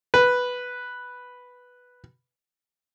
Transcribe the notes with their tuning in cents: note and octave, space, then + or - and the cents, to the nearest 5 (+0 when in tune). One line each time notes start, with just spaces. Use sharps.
B4 +0